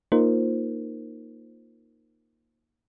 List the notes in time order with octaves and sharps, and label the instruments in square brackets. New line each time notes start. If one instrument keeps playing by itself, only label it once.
[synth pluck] A#3 D#4 F4 A#4 C5